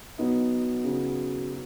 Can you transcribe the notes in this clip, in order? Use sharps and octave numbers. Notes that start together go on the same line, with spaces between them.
B2 F#3 B3 D#4
C#3 F#3
F#3